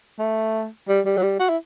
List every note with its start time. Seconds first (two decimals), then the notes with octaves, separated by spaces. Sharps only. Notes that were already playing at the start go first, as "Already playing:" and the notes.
0.19 A3
0.88 G3
1.05 G3
1.17 F#3
1.22 G3
1.40 F#4
1.49 E4